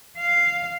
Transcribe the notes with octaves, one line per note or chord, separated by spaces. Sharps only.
F5